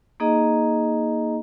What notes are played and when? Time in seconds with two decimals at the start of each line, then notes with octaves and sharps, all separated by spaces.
0.20 A#3 D#4 G#4 D#5 A#5